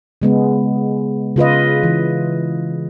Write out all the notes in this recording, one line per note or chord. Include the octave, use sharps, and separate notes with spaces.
C#3 G#3 B3
C#3 F4 B4 D#5
E3